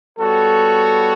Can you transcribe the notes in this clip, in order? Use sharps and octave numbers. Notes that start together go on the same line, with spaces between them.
G3 B3 F#4 A4 C#5